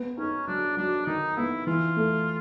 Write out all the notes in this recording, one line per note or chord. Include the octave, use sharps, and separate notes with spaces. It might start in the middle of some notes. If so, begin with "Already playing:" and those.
Already playing: B3
C#4 D#4
F#3 D4
F#3 D4
D#3 D#4
B3 E4
E3 F4
A3